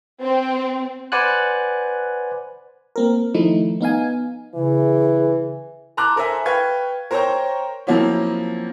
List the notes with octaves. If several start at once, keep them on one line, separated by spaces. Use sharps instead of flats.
C4
B4 C5 D5 F#5 G#5 F#6
A#3 C4 A#4
D#3 F3 A3 D#4 E4
B3 D#4 F5 G#5
C#3 E3
A5 A#5 C6 D6 F#6
A4 A#4 C5 E5 G#5
B4 F5 G5 C#6 G#6
A#4 C5 C#5 G5 A#5 C#6
F3 F#3 A#3 C4 C#4 E4